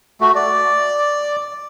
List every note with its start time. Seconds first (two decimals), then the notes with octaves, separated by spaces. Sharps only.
0.21 A3 F#4
0.35 D5